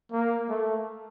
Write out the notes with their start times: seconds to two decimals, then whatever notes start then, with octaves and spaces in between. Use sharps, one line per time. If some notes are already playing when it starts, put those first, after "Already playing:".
0.12 A#3
0.49 A3